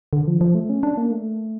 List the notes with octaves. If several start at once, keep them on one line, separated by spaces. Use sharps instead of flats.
D3
F3
F3
A3
C#4
D4
A#3
A3